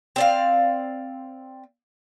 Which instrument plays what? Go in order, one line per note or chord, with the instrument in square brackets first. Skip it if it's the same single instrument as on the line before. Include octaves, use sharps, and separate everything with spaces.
[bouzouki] C4 D5 F5